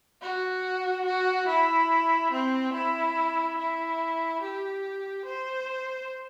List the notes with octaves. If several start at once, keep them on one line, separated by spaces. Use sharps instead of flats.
F#4
F#4
E4
C4
E4
E4
G4
C5